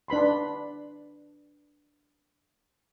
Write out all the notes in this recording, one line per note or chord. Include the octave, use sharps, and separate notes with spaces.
D4 B4 B5 C6